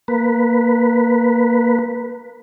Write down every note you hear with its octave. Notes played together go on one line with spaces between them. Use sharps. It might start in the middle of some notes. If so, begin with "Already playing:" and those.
A#3 B4